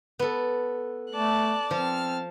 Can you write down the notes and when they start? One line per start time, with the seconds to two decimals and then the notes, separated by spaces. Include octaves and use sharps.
0.19 B3 A4
1.12 A3 D5 A5 F#6
1.71 F3 C4 A5 F6